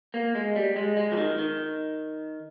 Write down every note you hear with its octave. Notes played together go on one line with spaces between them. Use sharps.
A#3
G#3
G3
G#3
G#3
F3
D#3
D#3